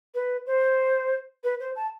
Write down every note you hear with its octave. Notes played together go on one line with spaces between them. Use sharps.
B4
C5
B4
C5
A5